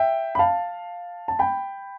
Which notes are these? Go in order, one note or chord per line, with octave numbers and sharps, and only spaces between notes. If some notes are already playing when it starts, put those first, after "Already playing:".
Already playing: E5 G5
B5
F5 A5
A5
G5 B5